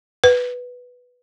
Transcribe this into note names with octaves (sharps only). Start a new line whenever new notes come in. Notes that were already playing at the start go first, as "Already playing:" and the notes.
B4